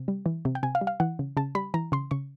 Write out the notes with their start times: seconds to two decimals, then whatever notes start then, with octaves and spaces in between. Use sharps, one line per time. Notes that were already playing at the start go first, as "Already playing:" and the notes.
Already playing: C3
0.08 G3
0.26 E3
0.45 C3
0.55 G5
0.63 C3 G#5
0.75 F5
0.81 G3
0.87 F5
1.00 E3 F#5
1.19 C#3
1.37 C#3 A5
1.55 G3 B5
1.74 E3 A#5
1.92 C#3 C6
2.11 C#3 C#6